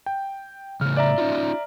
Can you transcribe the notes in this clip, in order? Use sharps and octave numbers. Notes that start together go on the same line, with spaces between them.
G5
A2 C#3 F6
D5 E5 A#5
C#4 D#4 F4